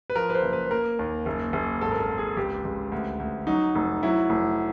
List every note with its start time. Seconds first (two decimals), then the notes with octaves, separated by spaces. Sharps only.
0.10 B4
0.15 F3 A#4
0.30 B4
0.35 C5
0.43 F#1
0.53 B4
0.70 A#3 A#4
0.99 D#2
1.26 F#1
1.53 F#1
1.81 G#1 A4
1.91 A#4
1.99 A4
2.09 G#1
2.18 G#4
2.37 C#2 G4
2.65 C#2
2.92 D2
3.20 D2
3.47 F#3 D#4
3.76 F1
4.03 F#3 E4
4.30 F1